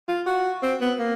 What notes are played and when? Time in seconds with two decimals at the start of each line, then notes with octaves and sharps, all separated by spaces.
0.08 F4
0.26 F#4
0.63 C4
0.81 B3
0.99 A#3